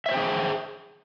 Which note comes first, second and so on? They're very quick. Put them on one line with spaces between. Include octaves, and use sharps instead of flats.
E5 C#5 C5 G5 G#4